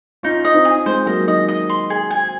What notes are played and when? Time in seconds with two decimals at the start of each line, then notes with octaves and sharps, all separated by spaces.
0.23 C#4 D#4 F4
0.45 D#5
0.54 C4 D#4
0.65 G#4
0.86 G#3 C4 C5
1.06 F#3 A#3 D#5
1.27 D#3 D#5
1.48 D#5
1.69 C6
1.90 G#4
2.11 G#5